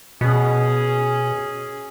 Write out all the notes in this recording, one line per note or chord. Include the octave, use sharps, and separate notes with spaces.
B2 C#4 G#4